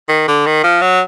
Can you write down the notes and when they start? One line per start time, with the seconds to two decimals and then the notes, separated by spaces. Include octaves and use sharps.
0.09 D#3
0.28 D3
0.46 D#3
0.64 F3
0.82 F#3